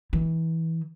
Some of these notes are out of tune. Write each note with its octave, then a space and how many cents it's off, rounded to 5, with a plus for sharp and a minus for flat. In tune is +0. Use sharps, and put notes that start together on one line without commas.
E3 -20